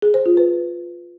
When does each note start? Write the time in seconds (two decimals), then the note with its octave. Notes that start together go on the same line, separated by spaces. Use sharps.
0.02 G#4
0.14 C5
0.26 F4
0.37 B4